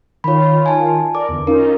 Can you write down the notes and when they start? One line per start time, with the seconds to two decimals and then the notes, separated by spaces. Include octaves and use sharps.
0.24 D#3 F4 C#5 B5
0.66 G#5 A5
1.15 A#4 D5 D6
1.29 E2 D3
1.47 C#4 D#4 F4 A#4